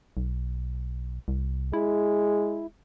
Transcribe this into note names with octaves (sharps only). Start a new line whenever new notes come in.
B1
C2
G#3 E4